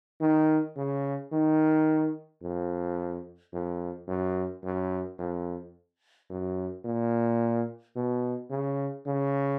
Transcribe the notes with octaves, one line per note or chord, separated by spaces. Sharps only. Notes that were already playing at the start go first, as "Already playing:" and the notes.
D#3
C#3
D#3
F2
F2
F#2
F#2
F2
F#2
A#2
B2
C#3
C#3